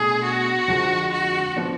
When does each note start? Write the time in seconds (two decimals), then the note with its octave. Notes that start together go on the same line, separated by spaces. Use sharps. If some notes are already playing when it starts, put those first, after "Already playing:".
Already playing: B2 A3 D4 G#4
0.23 F#4
0.68 F2 D3 F3 G#3
1.12 F#4
1.56 F3 B3 D4